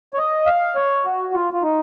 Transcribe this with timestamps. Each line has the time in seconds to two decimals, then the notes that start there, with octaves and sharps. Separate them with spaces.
0.14 C#5
0.18 D#5
0.46 F5
0.75 C#5
1.05 F#4
1.34 F4
1.53 F4
1.62 D#4